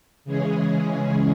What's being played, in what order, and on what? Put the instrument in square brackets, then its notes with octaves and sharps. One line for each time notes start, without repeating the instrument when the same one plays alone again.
[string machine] C#3 E3 G#3 C#4 G#4